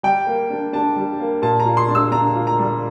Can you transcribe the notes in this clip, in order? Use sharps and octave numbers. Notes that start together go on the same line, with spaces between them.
G3 G5
A#3
D4
D4 A5
G3
A#3
A#2 A5
A#5
F4
C6
D4
E6
D4 A#5
F4
A#5
G3